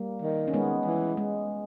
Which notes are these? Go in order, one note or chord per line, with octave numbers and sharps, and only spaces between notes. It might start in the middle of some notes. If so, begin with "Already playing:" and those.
Already playing: G3 A#3
D#3
C#4
G#3 B3
E3
G#3